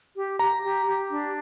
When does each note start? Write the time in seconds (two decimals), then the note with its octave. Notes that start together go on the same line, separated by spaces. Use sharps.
0.16 G4
0.39 G4 A#5
0.62 G4
0.86 G4
1.10 D4